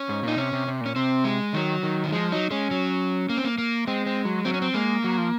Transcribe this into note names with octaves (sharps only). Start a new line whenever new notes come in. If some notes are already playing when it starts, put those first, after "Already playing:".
Already playing: C#4
G#2
A#2 D#4
C3 C#4
C3
C3
A#2 C#4
C3 C4
G#3
D#3 F#3
D#3
D#3
F3 G#3
F#3 D#4
G#3 C#4
F#3
A#3
C4
A#3
A#3
G#3 C4
C4
F#3
F#3 C4
C#4
C4
G#3 A#3
F#3
F3